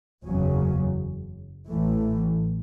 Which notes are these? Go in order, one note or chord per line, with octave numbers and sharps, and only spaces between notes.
F#1 E2 C#3 F#3 C#4
A1 A2 E3 A3